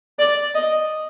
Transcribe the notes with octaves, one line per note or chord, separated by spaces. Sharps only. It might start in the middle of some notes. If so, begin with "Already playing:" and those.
D5
D#5